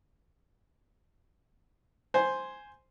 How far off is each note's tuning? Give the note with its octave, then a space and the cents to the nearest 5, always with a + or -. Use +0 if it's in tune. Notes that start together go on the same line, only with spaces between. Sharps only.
C5 +0 G#5 +0